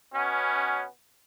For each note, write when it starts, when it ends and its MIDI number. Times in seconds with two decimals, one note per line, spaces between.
0.14 0.84 47
0.14 0.84 59
0.14 0.84 61